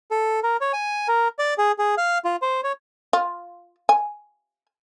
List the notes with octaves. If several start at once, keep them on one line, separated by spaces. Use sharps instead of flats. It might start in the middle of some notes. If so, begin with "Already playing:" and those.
A4
A#4
C#5
G#5
A#4
D5
G#4
G#4
F5
F4
C5
C#5
F4
G#5